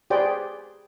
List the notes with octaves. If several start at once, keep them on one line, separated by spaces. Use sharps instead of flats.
G4 G#4 B4 C5 D5 G5